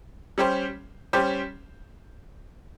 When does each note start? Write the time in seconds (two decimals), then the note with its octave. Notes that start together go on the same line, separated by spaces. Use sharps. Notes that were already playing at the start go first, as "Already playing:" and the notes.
0.38 G3 C#4 G4 C5
1.13 G3 C#4 G4 C5